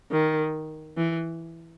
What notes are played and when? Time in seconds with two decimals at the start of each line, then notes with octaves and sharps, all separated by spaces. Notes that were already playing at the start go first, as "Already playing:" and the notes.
0.11 D#3
0.97 E3